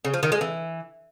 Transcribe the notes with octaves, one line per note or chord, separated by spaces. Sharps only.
C#3
F3
D#3
G#3
E3